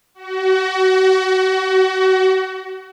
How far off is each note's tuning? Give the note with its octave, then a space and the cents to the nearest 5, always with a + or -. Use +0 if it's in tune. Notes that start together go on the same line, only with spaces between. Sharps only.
F#4 +30